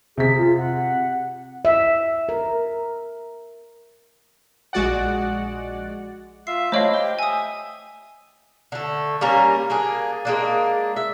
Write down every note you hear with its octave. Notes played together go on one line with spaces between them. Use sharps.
C3 G#4 B6
F4
F#5
E5
A#4
A#1 G#3 F#4 D5 F#5
F4 E5 C7
A3 D4 E4 F4 C5 C#5 D#5 F5
G4 G5 G7
E5 G#5 D#6
D3 A3
G3 A#3 C#4 A#4
A#3 D4 G#4
G#3 A#3 D4
E5